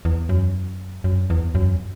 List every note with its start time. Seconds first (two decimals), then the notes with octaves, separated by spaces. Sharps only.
0.05 E2
0.29 F#2
1.04 F#2
1.30 E2
1.55 F#2